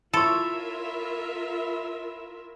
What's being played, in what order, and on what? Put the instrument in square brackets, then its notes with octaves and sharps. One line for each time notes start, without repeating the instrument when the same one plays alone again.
[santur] E4 C#5 [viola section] F4 A#4 E5 [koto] A4 [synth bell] C6 E7